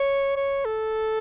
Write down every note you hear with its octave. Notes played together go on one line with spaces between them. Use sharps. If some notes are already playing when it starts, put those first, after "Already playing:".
Already playing: C#5
C#5
A4